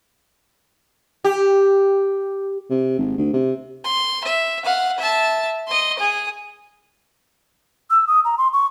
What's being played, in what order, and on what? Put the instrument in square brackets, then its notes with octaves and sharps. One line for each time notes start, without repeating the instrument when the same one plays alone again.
[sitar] G4
[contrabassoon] C3
G#1
D2
C3
[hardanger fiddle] C6
E5
F5 F#5
E5 A5
D#5 C6
G#4 D#6
[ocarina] E6
D#6
A#5
C6
C#6